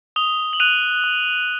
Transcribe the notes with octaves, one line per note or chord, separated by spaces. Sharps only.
D#6 F7 G7
F#7
F#6 D#7 F7
D#6